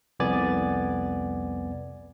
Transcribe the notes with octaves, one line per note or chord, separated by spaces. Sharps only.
C2 F2 B3 D5 G#5 A6